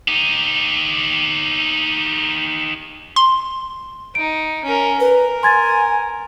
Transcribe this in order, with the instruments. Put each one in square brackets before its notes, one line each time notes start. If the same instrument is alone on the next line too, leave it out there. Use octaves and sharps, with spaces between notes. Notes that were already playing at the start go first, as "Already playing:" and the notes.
[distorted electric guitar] D#4 G4
[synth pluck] C6
[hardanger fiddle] D#4 [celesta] D7
[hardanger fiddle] C#4 A#4
[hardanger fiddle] A#4 [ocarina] B4
[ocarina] G#5 [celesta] C6 G#6 A6